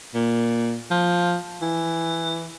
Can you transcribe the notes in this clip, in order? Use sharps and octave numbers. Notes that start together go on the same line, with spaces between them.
A#2
F3
E3